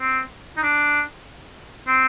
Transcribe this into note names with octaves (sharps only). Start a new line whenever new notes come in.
C4
D#4
D4
C4